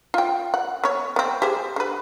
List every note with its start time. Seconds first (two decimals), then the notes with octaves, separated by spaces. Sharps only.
0.14 F4 G5
0.54 F#5
0.84 B3 C#5
1.16 B3 C4
1.42 G4 G#4 C5
1.76 D3 B4